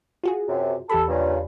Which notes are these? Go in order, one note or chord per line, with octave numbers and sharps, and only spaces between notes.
F4 F#4 G#4
F#2 C3
E2 G4 A4 B5
G2 A#2 C#3